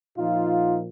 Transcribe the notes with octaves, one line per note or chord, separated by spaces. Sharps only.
A#2 F3 D#4 F4